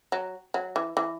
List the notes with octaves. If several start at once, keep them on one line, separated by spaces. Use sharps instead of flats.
F#3
F#3
E3
E3